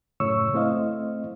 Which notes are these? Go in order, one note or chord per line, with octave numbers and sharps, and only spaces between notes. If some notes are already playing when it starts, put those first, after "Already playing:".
F#2 A2 C#3 C#5 C#6 E6
A3 C4 E4 C5 D#5 F5